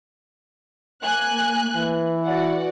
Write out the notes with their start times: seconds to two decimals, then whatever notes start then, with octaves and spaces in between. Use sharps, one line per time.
1.03 A#3 G#5 F#6
1.76 E3
2.25 F#4 D5 F#5